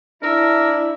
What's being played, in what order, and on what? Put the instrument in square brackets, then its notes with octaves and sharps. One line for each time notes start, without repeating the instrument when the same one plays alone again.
[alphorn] D4 [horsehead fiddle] E4 [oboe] A#4 [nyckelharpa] E5